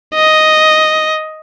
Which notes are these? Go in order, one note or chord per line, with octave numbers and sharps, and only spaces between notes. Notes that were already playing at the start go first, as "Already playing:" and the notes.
D#5